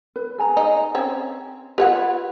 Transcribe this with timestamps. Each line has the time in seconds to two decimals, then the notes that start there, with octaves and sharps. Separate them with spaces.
0.16 B4
0.38 G#4 G#5 A#5
0.57 D#4
0.95 C4 C#4
1.78 F4 G4 B4 C#5 F#5